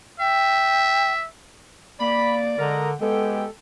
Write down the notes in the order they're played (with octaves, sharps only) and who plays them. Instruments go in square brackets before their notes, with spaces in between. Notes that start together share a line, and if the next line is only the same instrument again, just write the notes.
[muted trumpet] E5 [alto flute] G5
[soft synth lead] A#3 [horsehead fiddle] D5 [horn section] B5
[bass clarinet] D3 [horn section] G#3 D#5 A#5 [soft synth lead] A#4
[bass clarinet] G#3 [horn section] B3 G4 [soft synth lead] A4 [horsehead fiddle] G5